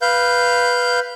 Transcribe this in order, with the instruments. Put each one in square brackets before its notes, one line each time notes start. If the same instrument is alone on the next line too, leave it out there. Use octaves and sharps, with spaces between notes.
[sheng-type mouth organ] B4 F5 G6